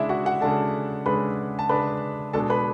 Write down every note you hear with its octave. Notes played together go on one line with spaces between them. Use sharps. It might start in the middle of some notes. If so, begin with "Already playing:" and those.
Already playing: C#3 G#3 D4 E4 E5
F#4 F#5
F#4 F#5
C#3 G#3 D4 A4 A5
C#3 G#3 D4 B4 B5
A5
C#3 G#3 D4 B4 B5
B2 G#3 D4 A4 A5
B4 B5